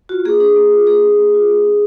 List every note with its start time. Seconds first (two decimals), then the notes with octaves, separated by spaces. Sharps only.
0.09 F4 F#4
0.25 A#3 G#4
0.40 D4 G#4
0.56 A#3
0.72 F4
0.87 A#3 G#4
1.03 D4
1.19 A#3
1.34 F4
1.50 A#3
1.66 D4